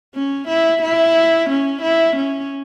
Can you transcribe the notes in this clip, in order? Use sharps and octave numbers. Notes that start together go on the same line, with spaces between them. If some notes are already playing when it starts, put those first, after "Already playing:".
C#4
E4
E4
C#4
E4
C#4